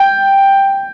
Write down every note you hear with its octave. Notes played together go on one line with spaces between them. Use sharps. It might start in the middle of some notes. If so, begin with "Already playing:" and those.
Already playing: G5